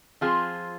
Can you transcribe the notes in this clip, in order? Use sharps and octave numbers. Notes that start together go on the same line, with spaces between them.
F3 C4 F4 G#4